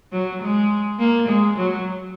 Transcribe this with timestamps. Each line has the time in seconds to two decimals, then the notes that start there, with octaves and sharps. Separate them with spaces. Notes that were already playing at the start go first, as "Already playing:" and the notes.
0.12 F#3
0.42 G#3
0.99 A#3
1.28 G#3
1.57 F#3